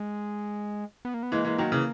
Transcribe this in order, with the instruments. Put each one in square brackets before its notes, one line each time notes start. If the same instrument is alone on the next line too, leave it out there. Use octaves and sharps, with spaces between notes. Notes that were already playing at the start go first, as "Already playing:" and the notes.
Already playing: [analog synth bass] G#3
B3
A#3
B3
[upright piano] E3 G#3 [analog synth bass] A#3
[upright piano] E3 G#3
D#3 F#3
C#3 E3